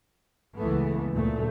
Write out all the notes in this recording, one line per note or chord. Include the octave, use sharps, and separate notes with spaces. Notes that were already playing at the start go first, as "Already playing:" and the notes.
C#2 E3 A3 B3
D2 A#2 A3